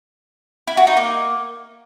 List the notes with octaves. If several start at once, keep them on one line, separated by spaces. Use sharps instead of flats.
E4
F#4
D#4
A#3